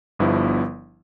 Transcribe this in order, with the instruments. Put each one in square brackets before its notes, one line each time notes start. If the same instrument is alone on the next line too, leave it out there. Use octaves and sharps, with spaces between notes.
[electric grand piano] G1 G2 F3 B3 E4